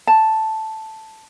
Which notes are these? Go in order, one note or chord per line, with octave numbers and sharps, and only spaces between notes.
A5